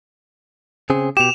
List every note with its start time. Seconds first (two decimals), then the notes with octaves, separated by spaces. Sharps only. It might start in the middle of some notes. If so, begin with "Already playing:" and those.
0.90 C#3 C4 G#4
1.17 B2 G4 E7 F7